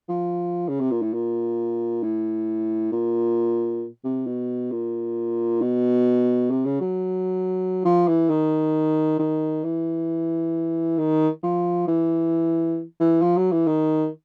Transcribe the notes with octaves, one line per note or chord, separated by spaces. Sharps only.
F3
C#3
C3
A#2
A2
A#2
A2
A#2
C3
B2
A#2
B2
C3
C#3
F#3
F3
E3
D#3
D#3
E3
D#3
F3
E3
E3
F3
F#3
E3
D#3